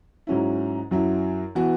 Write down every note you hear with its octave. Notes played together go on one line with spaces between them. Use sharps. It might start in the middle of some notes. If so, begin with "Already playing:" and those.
G#2 F#3 C#4 E4
F#2 F#3 E4
E3 B3 F#4